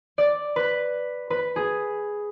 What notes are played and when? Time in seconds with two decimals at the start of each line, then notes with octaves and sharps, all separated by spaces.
0.18 D5
0.56 B4
1.30 B4
1.56 G#4